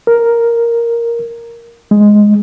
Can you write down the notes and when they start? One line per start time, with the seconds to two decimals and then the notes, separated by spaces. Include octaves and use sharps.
0.07 A#4
1.91 G#3